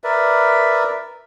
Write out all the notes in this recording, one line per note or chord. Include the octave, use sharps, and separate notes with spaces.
A#4 B4 D5 E5